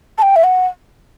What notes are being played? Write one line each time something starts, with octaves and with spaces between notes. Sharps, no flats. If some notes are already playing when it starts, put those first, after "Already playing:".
A5
G5
E5
F#5